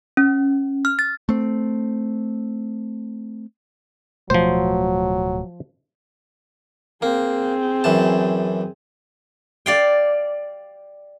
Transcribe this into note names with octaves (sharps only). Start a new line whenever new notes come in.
C#4
F6
A6
A3 C4
D1 B2 F3 F#3 A3 C5
A#3 C4 G#4
F#2 E3 A5
D5 F5 G5